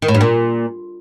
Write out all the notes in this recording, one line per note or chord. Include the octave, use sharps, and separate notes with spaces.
D#3
A2
G2
A#2